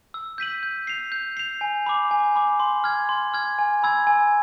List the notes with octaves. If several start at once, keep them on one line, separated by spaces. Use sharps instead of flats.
E6
G6 B6 D#7 F#7
G6
C7 F7
G6
C7 F7
G#5
B5 D6
G#5
B5 D6
C6
F6 G#6
C6
F6 G#6
G#5
B5 E6 G#6
G#5